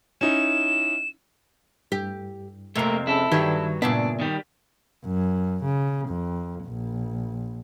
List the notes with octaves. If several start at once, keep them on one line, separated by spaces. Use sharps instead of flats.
C#4 D#4 E4 E7
G2 G4
F2 C3 A3 A#3 A#4
C#4 E4 G#4 A4
G2 D#3 F#3 G4 B4 G#6
G2 A#2 C#3 B3 D4 E5
D#3 G3
F#2
C#3
F2
A#1